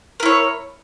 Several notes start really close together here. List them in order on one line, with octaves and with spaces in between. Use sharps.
A#4 E4 C#5